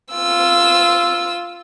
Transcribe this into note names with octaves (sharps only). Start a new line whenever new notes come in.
F4 E6